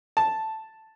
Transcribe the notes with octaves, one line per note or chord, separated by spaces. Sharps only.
A5